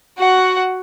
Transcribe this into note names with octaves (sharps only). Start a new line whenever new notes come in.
F#4 F#5